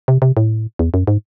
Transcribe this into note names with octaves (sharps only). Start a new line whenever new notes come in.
C3
C3
A2
E2
F#2
G#2